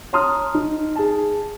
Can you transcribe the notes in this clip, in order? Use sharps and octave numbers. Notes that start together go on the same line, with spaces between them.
C#5 A5 A#5 C6 D#6 F6
D#4
G#4 A5